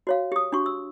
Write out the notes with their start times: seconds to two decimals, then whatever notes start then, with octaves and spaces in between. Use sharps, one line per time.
0.07 F#4 C#5 F5
0.32 G4 D#6
0.52 D4 F#4 C#6
0.66 E6